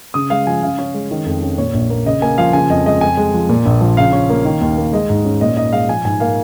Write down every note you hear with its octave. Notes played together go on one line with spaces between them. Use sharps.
C#3 D#6
G#3 F5
F3 G#5
C#3 F5
C#4
G#3
D#3
F2
C#4
A#2 C#5
A#1
A#3
C#3 D#5
A#3 G#5
F3 F5
C#3 G#5
F2 D#5
G#3 D#5
F2 G#5
G#3
F3
A#2
A#1
F3
C#3 F5
C#4
A#3
D#3
D#2
A#3
G#3 D#5
G#2
C#4
A#2 D#5
D#4 D#5
G#3 F5
F3 G#5
G#2 G#5
A#3 F5